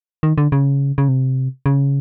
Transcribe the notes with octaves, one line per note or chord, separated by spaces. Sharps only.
D#3
D3
C#3
C#3
C3
C#3